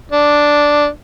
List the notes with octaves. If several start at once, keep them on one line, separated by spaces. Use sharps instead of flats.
D4